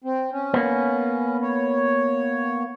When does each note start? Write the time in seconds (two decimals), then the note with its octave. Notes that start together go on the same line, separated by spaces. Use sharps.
0.04 C4
0.32 C#4
0.54 A#3 B3
1.42 C#5